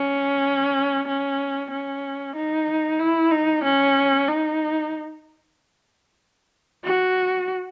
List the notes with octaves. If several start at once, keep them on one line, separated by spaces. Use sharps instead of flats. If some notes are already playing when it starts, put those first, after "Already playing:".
Already playing: C#4
C#4
C#4
D#4
E4
D#4
C#4
D#4
F#4